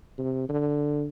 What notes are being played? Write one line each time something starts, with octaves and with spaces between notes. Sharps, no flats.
C3
D3